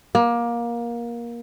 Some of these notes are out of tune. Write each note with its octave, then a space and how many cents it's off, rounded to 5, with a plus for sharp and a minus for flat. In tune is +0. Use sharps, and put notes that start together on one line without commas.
A#3 +20